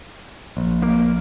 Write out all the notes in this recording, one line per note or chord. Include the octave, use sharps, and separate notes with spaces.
A#1
A#3